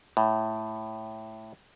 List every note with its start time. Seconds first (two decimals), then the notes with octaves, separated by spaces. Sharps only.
0.17 A2